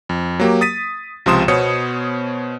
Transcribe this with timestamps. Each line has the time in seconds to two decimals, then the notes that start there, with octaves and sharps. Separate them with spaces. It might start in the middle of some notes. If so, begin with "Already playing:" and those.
0.09 F2
0.40 F#3 A#3 G4
0.61 D#6 A6 B6 D#7
1.26 C#2 C3 F3 C6 D#6 E7
1.48 B2 B3 C5 C#5 D#6 C#7